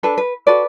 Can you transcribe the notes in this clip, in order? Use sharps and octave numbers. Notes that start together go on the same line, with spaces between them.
D4 A4 B4
B4
F#4 A4 B4 D5